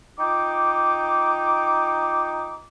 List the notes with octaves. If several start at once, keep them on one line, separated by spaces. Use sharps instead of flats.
D#4 F4 G5 D6